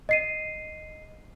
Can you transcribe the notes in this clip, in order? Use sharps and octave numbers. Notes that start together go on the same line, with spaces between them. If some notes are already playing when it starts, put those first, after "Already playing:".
D#5 C7 D#7